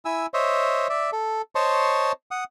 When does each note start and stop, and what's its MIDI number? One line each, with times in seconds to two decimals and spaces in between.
0.05 0.26 64
0.05 0.26 80
0.05 0.26 88
0.34 0.88 72
0.34 0.88 73
0.34 0.88 75
0.34 0.88 76
0.90 1.10 74
0.90 1.10 76
1.13 1.42 69
1.55 2.12 72
1.55 2.12 73
1.55 2.12 75
1.55 2.12 81
1.55 2.12 84
1.55 2.12 85
2.31 2.44 78
2.31 2.44 87